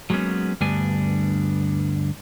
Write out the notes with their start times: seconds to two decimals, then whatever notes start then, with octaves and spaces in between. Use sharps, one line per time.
0.10 F#3 G#3 A#3 B3 C#4
0.61 D2 G2 G3 B3 D4 G#5